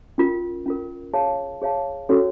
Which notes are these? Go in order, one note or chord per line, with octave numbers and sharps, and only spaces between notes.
C#4 F4 A#4
C#4 F4 A#4
G#4 C#5 F5 A5
G#4 C#5 F5 A5
C#4 F#4 A4 C#5